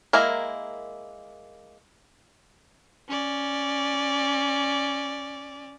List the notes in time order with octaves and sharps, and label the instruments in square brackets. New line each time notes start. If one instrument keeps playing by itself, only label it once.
[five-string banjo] G#3 A#3 E4 A#4
[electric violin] C#4 D5